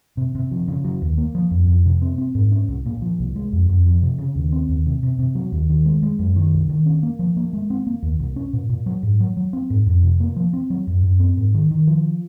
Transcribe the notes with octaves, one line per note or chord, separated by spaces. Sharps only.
C3
C3
F3
C#3
F#3
D#2
A#3
F3
F2
F2
C3
C4
C4
G#2
C#4
C2
A#2
F3
C2
G#3
F2
F2
F3
C3
C#3
D#2
C4
D#2
C3
C3
C3
F#3
D#2
D#3
G#3
G#3
F#2
D#3
C2
D#3
C#4
A#3
F3
A#3
G#3
C4
A#3
D#2
C2
C#4
A#2
A#2
F#3
G#2
F#3
F#3
C4
G#2
F2
C3
A#3
F3
C4
F#3
F#2
F#2
C4
G#2
D#3
D#3
F3